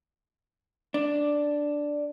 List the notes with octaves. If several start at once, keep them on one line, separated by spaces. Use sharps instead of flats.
D4